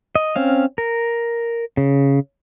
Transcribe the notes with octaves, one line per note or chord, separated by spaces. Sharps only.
D#5
C4 C#4 F5
A#4
C#3